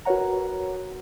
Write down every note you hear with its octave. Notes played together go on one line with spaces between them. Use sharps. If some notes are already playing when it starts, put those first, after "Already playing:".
F#4 A#4 B4 C#5 F#5 A#5